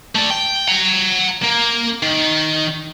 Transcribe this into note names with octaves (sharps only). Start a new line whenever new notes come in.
A3 D5
G5
F#5 A#5
A#3
D#3